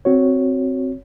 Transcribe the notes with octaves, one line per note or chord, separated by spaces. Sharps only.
C4 F#4 C#5